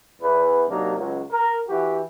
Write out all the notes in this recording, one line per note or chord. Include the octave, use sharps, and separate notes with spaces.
E2 B4
C3 F#3 A#3 D4 D#4
C#2 F#3
A#4
E3 F#4 G4